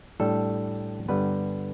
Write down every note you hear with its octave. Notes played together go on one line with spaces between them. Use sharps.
A2 G3 D4 A4
G2 D3 G3 B3 B4